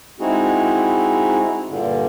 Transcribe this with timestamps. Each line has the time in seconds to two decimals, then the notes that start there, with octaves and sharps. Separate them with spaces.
0.20 G#3 C4 D#4 E4 F#4 G#4
1.69 G2 A#2 D3